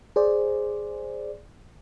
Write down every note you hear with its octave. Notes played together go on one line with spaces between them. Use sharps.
G#4 C5 D5